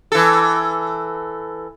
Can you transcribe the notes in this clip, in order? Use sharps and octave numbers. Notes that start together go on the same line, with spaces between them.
E3 A4